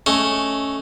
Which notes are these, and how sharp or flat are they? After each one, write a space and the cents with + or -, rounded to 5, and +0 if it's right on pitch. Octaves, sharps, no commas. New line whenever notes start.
A3 -10 C#4 +0 D#5 +0